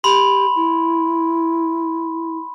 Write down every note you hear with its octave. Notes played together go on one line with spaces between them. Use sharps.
G4 B5 C6
E4